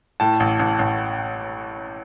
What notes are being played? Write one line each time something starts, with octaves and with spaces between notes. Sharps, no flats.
A2 A5
A1
A1
A1